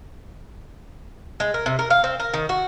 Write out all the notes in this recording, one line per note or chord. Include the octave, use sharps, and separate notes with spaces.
G#3
A#4
C3
A#4
F5
C4
A#4
D#3
F#4